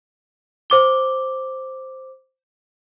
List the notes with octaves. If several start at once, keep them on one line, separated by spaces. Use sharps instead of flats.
C5 D6 G7